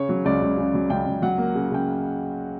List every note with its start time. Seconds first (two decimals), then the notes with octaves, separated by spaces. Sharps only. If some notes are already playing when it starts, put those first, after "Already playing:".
Already playing: C#3 C#5
0.09 F#3
0.25 C#2 D5
0.42 C#2
0.57 C#3
0.74 F#3
0.89 C#2 G5
1.06 C#2
1.22 F#3 F#5
1.38 A#3
1.55 C#3
1.71 C#3 G5